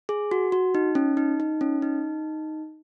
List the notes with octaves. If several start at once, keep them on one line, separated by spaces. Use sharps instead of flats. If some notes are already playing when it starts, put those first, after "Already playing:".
G#4
F#4
F#4
D#4
C#4
D#4
D#4
C#4
D#4